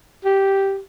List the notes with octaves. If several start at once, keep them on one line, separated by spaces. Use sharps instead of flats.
G4